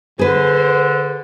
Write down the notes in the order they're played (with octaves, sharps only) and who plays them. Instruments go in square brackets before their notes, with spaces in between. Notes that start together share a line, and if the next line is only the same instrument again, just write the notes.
[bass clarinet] D3 [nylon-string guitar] G#4 B4 [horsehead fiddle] C5